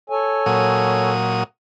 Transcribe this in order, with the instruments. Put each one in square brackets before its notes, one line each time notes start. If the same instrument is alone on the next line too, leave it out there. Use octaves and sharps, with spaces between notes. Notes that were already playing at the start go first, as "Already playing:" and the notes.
[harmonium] A4 C#5 G#5
[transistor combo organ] A#2 F#3 D#6